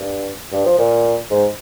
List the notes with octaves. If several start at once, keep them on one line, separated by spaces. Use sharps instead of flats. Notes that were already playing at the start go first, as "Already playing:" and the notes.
Already playing: G2
G2
F3
A#2
G#2